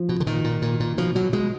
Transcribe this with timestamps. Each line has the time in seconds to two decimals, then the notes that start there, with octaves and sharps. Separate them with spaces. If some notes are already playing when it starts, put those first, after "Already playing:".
Already playing: F3
0.09 B2
0.20 D3
0.26 A#2 D#3
0.44 A#2
0.62 A#2
0.80 A#2
0.98 B2 F3
1.15 B2 F#3
1.33 B2 G#3